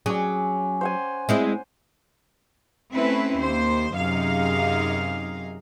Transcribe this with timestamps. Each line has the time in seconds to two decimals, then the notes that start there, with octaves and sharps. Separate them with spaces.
0.06 F#3 C#4 G#4 D6
0.81 C5 F#5 G#5
1.29 G#3 C4 E4
2.93 A3 C4 C#4 E4 B4
3.37 D#2 C5
3.96 F#2 C3 D#4 G#4 F5